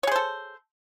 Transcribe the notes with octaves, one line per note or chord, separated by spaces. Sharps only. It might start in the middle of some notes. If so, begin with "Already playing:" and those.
G#4 A4 C5 C#5